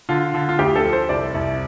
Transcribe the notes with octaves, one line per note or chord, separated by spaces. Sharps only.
D3 F4
D3
F4
D2 G4
A4
F3
C5
C2 D5
C2